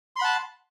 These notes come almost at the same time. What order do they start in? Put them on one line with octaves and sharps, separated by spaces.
C6 B5 F#5 A5